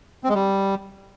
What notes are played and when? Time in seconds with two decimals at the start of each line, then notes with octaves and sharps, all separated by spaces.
0.24 C4
0.29 G#3
0.34 G3